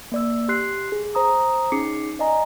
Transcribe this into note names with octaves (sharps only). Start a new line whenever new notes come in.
A#3 D5 E6
G4 C6 F#6 C7
G#4
C5 A#5 D#6
C#4 D#4 G#4 D6 C7 C#7
D5 D#5 G#5 A#5